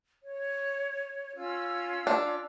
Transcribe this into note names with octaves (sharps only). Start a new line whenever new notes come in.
C#5
C#4 F4 E6
D4